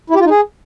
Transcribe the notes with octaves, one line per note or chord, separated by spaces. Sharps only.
E4
G4
F4
D#4
G#4